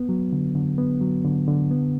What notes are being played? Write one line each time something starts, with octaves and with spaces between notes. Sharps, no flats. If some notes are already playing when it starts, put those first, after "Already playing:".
Already playing: B3
F#3
D3
D3
B3
F#3
D3
D3
B3